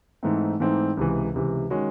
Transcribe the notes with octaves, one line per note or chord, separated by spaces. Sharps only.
G#2 E3 A3 C4 D#4
G#2 E3 A3 C4 D#4
C#2 C3 E3
C#2 C3 E3
D#3 G#3 C#4 F#4